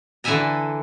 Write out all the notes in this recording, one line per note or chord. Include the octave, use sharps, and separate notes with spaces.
D3 E3 A4 E5 G#5 A#5